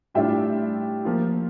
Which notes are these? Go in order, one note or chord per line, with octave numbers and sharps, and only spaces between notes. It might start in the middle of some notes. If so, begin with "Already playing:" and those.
A2 G3 D4 F4 E5 G5
F3 A#3 F4